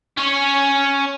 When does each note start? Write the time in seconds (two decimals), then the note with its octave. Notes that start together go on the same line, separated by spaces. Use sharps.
0.17 C#4 C#5